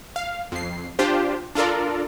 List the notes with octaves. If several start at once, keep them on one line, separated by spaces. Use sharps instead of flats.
F5
F2 C7
D4 F4 G4 C5
D4 F4 A4 A#4 D5